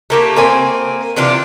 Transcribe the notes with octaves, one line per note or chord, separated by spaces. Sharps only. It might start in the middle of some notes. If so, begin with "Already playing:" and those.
A3 A#3 G4
A#3 C4 G#5
C3 E3 D4 F4